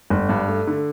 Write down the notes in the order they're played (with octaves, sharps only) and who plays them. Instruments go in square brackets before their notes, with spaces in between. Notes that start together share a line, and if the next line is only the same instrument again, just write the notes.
[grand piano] G1
G2
A3
D3